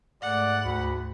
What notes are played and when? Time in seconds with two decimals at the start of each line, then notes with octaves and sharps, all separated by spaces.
0.22 G#2 A3 D5 F#5
0.65 D2 B5